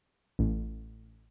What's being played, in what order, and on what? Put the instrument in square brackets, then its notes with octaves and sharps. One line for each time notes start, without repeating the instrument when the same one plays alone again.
[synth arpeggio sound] A1